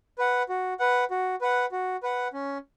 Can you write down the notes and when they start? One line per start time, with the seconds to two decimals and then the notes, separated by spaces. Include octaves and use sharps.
0.18 B4 F#5
0.49 F#4
0.80 B4 F#5
1.11 F#4
1.41 B4 F#5
1.72 F#4
2.03 B4 F#5
2.33 C#4